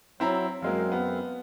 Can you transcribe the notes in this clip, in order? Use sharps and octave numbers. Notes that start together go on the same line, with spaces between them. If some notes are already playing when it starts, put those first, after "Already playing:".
F#3 C4 E4 A#5
F#2 F#3 G#3 A#3 C4 F5
B3